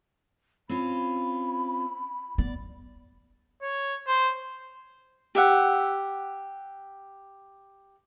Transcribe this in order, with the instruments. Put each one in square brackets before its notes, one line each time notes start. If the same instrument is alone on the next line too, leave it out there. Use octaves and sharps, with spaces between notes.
[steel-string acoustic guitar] C4 C#4 F4 [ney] B5
[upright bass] B3 [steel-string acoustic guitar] D5
[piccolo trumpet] C#5
C5
[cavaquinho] G4 E5 F#5